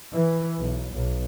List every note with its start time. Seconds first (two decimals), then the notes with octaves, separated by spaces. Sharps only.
0.12 E3
0.59 B1
0.93 B1